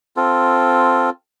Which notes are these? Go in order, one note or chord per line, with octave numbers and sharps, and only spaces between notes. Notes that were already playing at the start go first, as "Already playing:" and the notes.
C4 F4 A4